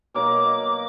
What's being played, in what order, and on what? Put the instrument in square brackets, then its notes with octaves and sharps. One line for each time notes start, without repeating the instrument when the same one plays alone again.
[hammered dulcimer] B2 F#3 A#3 D#4 [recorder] D6